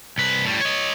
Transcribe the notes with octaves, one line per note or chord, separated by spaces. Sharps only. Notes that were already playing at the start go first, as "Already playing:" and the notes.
C2 B4
A2 G3
C#5 D#5